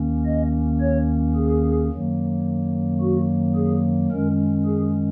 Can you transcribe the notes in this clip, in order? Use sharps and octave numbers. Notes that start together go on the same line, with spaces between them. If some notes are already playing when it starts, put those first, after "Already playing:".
Already playing: D#2 D#3 A#3 C#4
D#5
C#5
G#4
F#2 D#3 F#3 A#3
F#4
G#4
F#2 D#3 G#3 C#4 A#4
G#4